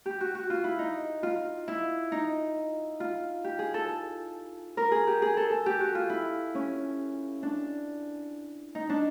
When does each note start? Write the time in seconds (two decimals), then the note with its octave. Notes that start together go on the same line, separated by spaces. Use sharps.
0.06 G4
0.21 F#4
0.35 F#4
0.50 F4
0.64 E4
0.79 D#4
1.23 F4
1.68 E4
2.12 D#4
3.00 F4
3.44 G4
3.59 G#4
3.74 A4
3.88 A4
4.77 A#4
4.91 G#4
5.07 G4
5.22 G#4
5.37 A4
5.50 A4
5.66 G4
5.80 F#4
5.95 F4
6.09 E4
6.55 C#4
7.43 D4
8.75 D#4
8.89 D4